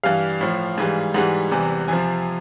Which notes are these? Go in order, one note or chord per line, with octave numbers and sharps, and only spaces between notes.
G2 E3 G3 F5
A2 F3
G#2 E3 G3
G#2 E3 G3 F#5
E2 C3 E3 G3
F2 C3 F3 G#5